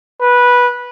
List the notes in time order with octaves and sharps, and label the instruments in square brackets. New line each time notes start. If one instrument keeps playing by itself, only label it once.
[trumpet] B4